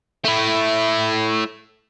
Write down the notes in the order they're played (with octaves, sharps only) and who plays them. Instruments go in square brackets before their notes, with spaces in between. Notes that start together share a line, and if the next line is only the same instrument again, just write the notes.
[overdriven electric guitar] A3 E4